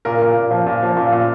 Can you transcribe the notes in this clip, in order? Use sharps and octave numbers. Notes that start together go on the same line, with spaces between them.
A#2 A#4
A#2
A#2
F3
A#2
F3
A#2
A#2